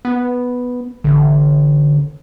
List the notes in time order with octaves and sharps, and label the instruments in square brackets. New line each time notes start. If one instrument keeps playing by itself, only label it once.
[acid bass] B3
[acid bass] A1 [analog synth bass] D3